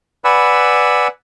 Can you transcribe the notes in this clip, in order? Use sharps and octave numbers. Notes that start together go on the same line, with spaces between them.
B4 D5 F#5 G#5 B5 E6